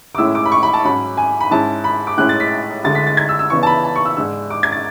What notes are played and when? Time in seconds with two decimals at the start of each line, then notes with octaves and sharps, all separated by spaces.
0.15 D6
0.18 A2 G#3 C#4 E4 E6
0.35 D6
0.45 B5
0.52 C#6
0.63 B5
0.73 A5
0.85 G#2 F#3 C#4 B5
1.17 G#5
1.40 B5
1.51 G#2 G#3 C#4 E4 A5
1.84 B5
2.07 D6
2.18 A2 G#3 C#4 E4 F#6
2.29 A6
2.40 B6
2.84 D2 D3 G#3 A6
2.95 B6
3.07 A6
3.17 G#6
3.29 E6
3.39 E6
3.50 C#3 E3 B3 D4 C#6
3.63 A5
3.67 B5
3.84 A5
3.95 C#6
4.05 E6
4.17 G#2 G#3 D4 E6
4.50 D6
4.63 G#6
4.72 A6